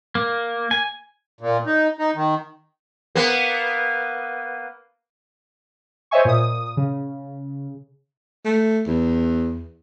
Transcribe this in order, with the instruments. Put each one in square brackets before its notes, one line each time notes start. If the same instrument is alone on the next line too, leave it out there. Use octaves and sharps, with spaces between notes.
[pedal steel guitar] A#3
G#5
[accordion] A#2
D#4
D#4
D#3
[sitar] A#3 B3
[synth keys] C5 C#5 D#5 E5 G#5 C#6
A#2 D#6
C#3
[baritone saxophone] A3
E2